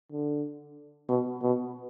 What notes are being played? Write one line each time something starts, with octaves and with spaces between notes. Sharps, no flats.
D3
B2
B2